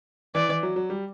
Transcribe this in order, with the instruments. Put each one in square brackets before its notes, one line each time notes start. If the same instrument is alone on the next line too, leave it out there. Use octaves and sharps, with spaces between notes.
[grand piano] E3 [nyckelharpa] D5
[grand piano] E3
F#3
F#3
G3